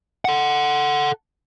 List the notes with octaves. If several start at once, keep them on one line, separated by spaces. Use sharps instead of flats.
A4 F#5